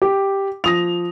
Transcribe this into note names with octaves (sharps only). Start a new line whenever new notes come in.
G4
F3 D#6 A#6 F7